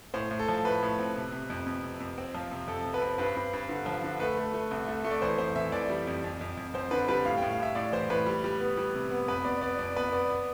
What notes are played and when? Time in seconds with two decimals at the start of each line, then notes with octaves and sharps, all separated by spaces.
0.14 A2 C5
0.31 A2
0.39 A4
0.49 F3
0.65 A2 B4
0.82 A2
0.99 C4
1.16 C3
1.32 C3
1.50 F2
1.66 F2
1.84 C3
2.00 F2
2.18 C4
2.35 F3
2.51 C3
2.67 F2 A4
2.85 C3
2.94 B4
3.02 C4
3.18 G2 B4
3.36 G2
3.53 G2
3.69 D3
3.86 F3
4.04 D3
4.20 A3 B4
4.37 A3
4.54 A3
4.71 C2
4.88 A3
5.04 A3
5.11 D5
5.22 E3 C5
5.38 F2 C5
5.56 E3 E5
5.72 E3 D5
5.89 G3
6.07 F2
6.24 F2
6.41 F2
6.57 F2
6.74 F2 C5
6.91 D3 B4
7.08 G3 B4
7.25 A2 F5
7.37 G5
7.42 A2
7.51 F5
7.59 A2 E5
7.75 A2 D5
7.93 E3 C5
8.10 A2 B4
8.26 G3
8.44 G3
8.60 B3
8.77 G3
8.95 C3
9.11 B3
9.28 F2 B4
9.45 B3 D5
9.62 B3 D5
9.79 F2 D5
9.96 B3 B4
10.12 B3 D5
10.30 B3